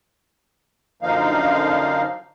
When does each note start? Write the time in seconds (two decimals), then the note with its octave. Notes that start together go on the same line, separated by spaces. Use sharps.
1.03 F#2 D3 F3 A#3 D#4 F5